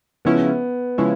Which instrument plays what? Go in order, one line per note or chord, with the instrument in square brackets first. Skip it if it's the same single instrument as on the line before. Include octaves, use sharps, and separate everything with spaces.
[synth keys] C#3 F3 G#3 C#4 E4 [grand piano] B3
[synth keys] C#3 F3 G#3 C#4 E4